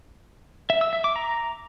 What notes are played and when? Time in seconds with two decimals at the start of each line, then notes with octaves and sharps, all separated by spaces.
0.70 E5
0.81 E6
0.93 E5
1.04 D6
1.16 A#5